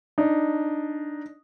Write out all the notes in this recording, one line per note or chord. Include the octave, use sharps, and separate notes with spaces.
D4 D#4